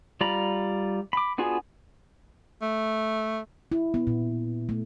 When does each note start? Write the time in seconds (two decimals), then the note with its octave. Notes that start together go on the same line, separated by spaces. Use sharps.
0.21 G3 F4 D5 A#5 B5
1.13 B5 D6
1.38 B3 D4 F4 F#4 G#4
2.62 A3
3.72 E4
3.94 B3
4.07 A#2
4.69 A3